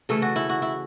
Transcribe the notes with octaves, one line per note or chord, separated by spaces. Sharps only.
C#3 E3 A3 C#4 A4
F#4
E4
F#4
E4